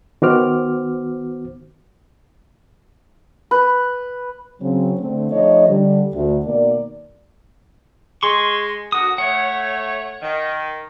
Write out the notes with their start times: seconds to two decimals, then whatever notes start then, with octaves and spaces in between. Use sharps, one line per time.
0.22 D#3 B3 F#4 C5 D6 F6
3.51 B4
4.61 C#3 F#3 C4
4.99 D3 A3 C4
5.32 F3 A3 D#4 C#5 D#5
5.68 D3 G3
6.14 D2
6.45 B2 D#3 A#3 D5
8.23 G#3 G#4 C6 C#6
8.92 D3 A#3 F#4 D#6
9.18 A3 C#5 F#5
10.22 D#3